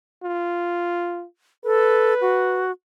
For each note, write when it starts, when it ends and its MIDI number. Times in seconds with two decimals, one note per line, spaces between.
0.23 1.25 65
1.65 2.14 69
1.65 2.64 71
2.21 2.71 66